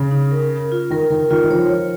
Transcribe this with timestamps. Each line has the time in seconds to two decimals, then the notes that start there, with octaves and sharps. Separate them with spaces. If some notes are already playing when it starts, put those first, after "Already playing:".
Already playing: C#3
0.11 D#4
0.31 A#4
0.51 A#4
0.72 F4
0.90 D#3 A#4
1.10 D#3 A#4
1.31 D#3 F4
1.43 D#3
1.50 F3 C#5
1.70 C#5